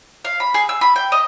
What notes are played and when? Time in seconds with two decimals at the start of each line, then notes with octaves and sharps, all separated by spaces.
0.25 F5
0.40 B5
0.54 G#4
0.69 E6
0.81 B5
0.96 G5
1.12 D#5